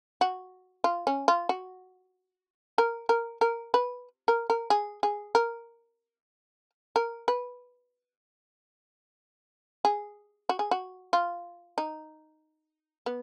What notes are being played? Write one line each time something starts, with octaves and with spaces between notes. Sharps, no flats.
F#4
F4
C#4
F4
F#4
A#4
A#4
A#4
B4
A#4
A#4
G#4
G#4
A#4
A#4
B4
G#4
F#4
G#4
F#4
F4
D#4
B3